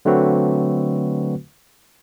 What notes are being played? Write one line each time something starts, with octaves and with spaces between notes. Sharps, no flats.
D3 F#3 A3 C4 F#4 B4